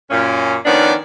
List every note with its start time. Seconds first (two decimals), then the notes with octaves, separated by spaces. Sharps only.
0.11 F#2 A#2 C#4
0.65 D#3 F3 B3 C#4 D4 D5